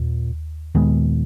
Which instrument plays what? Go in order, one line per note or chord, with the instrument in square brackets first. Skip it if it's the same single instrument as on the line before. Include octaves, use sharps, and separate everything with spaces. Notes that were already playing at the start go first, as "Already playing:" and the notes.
Already playing: [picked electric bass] D#2 [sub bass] A#2
[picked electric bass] D#2 D#3 G#3 B3 [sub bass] A#2